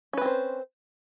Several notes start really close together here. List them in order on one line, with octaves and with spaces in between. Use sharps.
C#4 B4 C4 C5